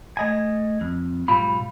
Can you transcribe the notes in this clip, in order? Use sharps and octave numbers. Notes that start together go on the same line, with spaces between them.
A3 D#5 G#5
F2
B1 G#2 G3 F4 B5